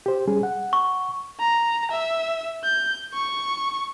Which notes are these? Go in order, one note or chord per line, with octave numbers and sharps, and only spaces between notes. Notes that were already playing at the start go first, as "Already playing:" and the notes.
G4 C5
G3 C#4 G#4
F#5
C#6
A#5
E5
G6
C#6